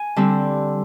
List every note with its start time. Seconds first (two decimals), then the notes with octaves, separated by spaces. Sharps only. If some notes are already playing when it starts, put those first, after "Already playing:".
Already playing: G#5
0.16 D3 G3 C4